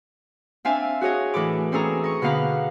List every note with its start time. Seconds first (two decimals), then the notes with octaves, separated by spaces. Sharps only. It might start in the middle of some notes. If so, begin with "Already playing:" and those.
0.65 C4 D4 E5 F5 G#5
1.01 F#4 G#4 C#5 D#5
1.34 A2 E3 A4 B5 D6
1.72 C4 C#4 G#4 A4 A#5
2.04 D#5 C#6
2.22 B2 D3 B3 F5 A#5 B5